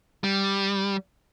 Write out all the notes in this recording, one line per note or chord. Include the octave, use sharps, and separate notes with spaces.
G3